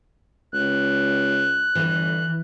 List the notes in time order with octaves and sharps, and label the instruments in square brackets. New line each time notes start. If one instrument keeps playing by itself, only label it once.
[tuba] C#2 [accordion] F#6
[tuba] G1 [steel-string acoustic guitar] E3